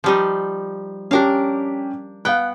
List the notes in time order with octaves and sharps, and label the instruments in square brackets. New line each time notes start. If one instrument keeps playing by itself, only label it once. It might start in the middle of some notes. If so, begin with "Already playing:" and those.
[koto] F3 G3 D#4
[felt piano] C#4 G4 [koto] D4 A#4 F5
[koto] B3 G5 [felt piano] F5 F#6